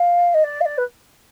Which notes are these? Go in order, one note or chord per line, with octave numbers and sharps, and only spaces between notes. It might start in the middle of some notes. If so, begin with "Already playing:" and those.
Already playing: F5
D#5
D5
F5
D5
B4